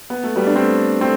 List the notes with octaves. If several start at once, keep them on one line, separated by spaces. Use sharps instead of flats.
B3
A3
G3 B3
D4
A3 C4
A3 C4